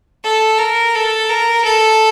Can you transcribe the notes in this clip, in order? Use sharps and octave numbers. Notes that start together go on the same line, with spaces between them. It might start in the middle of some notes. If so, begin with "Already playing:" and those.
A4
A#4
A4
A#4
A4